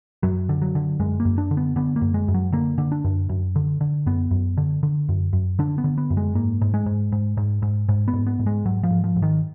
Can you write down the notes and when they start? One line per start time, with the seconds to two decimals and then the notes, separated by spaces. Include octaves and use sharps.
0.23 F#2 F#3
0.49 D3
0.62 F#3
0.75 D3
1.00 F#2 G#3
1.20 A#3
1.25 F#2
1.38 D4
1.51 D3
1.57 B3
1.76 D3 B3
1.96 A#3
2.01 F#2
2.14 G#3
2.28 F#2
2.34 F#3
2.52 D3 A#3
2.78 D3
2.92 D4
3.04 F#2
3.29 F#2
3.56 D3
3.81 D3
4.06 F#2 B3
4.31 F#2
4.57 D3
4.83 D3
5.09 F#2
5.33 F#2
5.59 D3 D4
5.78 B3
5.84 D3
5.98 B3
6.10 F#2
6.17 G#3
6.35 G#2 A#3
6.61 G#2
6.74 G#3
6.86 G#2
7.12 G#2
7.37 G#2
7.62 G#2
7.89 G#2
8.08 B3
8.13 G#2
8.27 B3
8.39 G#2
8.46 G#3
8.65 G#2 F#3
8.83 F3
8.90 G#2
9.04 F3
9.16 G#2
9.22 D#3